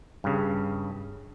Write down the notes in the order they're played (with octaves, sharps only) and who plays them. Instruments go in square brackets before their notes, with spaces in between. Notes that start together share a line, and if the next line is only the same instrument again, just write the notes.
[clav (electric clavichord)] G2 C#3